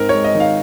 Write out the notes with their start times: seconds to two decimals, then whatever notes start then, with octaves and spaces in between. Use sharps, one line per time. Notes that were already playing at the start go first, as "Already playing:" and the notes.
Already playing: G#2 C4 A#4
0.09 C#5
0.15 G#3
0.24 D#5
0.35 D#3
0.40 F5